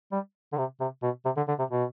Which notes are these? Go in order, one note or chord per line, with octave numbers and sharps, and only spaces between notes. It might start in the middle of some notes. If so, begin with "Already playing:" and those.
G3
D3
C3
C3
B2
C3
D3
D3
C3
B2